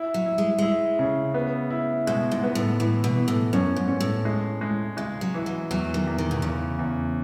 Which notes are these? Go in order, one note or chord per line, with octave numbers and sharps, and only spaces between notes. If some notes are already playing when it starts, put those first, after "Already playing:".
Already playing: E4
F#3
E4
G#3
G#3 E4
C#3
B3
E4
B2 G#3
G#2
B3
A2
A2 E3
B2
E3
A2
F#2 C#4
G#2
C#4
A2
G#3
G#3
C#3 G#3
F#3
E3
F#3
E2 F#3
D#3
E2
D#3
B2
E2 C#3
E2